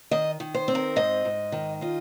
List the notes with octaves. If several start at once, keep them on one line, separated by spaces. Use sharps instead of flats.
D#3 D#5
D#3
C5
C4
A#4
G#2 D#5
G#2
D#3
F4 D#5